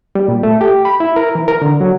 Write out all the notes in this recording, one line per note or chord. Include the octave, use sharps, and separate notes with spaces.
G3
A#2
A3
G4
B5
E4
A#4
E3
A#4
D3
F#3